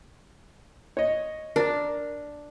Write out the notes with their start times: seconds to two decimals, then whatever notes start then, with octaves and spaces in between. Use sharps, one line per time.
0.97 C#5 D#5
1.56 D4 A#4